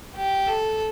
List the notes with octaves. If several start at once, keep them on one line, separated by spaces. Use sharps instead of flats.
G4
A4